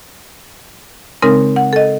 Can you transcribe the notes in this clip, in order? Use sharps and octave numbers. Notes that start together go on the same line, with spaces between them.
C#3 G#3 C4 D#4 A#4
F#5
A4 D#5